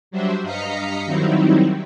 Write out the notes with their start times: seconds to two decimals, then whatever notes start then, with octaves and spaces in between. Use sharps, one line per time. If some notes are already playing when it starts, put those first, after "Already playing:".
0.11 F#3 G3 D4 C5 E5
0.43 G2 D#5 F5 A#5 B6 C#7
1.06 D#3 F#3 G3 C4 D#4 E4